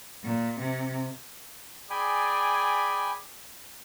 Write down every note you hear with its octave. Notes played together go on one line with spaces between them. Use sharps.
A#2
C3
G#4 D5 G5 G#5 B5